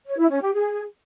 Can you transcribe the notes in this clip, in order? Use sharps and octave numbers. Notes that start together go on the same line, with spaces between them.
C#5
E4
C#4
G4
G#4